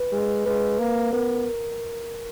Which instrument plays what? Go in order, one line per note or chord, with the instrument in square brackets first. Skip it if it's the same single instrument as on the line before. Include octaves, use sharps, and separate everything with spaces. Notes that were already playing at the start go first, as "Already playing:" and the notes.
Already playing: [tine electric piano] B4
[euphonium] G#3
[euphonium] G#3 [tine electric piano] B4
[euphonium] A#3
[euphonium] B3 [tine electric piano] A#4